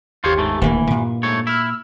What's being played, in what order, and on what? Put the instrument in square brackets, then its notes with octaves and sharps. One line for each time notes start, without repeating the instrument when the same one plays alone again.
[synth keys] G1 D#2 G4 [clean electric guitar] F4 C5 C#5
[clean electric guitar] G#2 A3
[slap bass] D#1 D2 A#3 [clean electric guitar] E3
[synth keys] G2 [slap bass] A#2
[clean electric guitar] G#2 A3 C#5
[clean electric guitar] E4 [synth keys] E6 F6